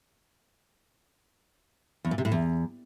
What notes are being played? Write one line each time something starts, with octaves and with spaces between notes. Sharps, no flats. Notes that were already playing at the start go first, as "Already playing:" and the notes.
E2
A#2
C3
A2
E2